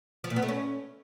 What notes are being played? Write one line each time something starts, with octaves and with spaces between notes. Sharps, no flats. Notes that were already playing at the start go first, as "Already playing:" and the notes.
F3
A#2
B3
A3
C#4